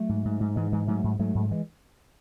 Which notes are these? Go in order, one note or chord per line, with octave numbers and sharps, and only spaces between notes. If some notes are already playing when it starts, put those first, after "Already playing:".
Already playing: F#3 A3
G#2
G#2
G#2
G#2 E3 G#3
G#2 E3 G#3
G#2 F#3 A3
G#2
G#2 F#3 A3
G#2
E3 G#3